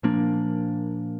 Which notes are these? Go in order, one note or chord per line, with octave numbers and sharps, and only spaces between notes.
A#2 F3 A#3 D4